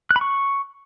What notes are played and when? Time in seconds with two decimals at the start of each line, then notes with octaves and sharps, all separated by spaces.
0.11 F#6
0.16 B5
0.21 C#6